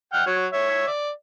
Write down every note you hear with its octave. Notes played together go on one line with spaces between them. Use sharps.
F#5 G5 F6
F#3 C#5
C#5 E5
D5